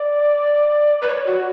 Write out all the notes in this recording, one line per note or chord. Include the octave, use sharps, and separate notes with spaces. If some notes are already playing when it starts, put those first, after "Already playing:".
Already playing: D5
B4
C#5
F#4